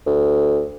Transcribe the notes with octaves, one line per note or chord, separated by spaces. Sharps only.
D2